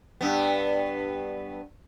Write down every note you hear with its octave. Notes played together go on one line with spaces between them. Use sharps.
G2 B3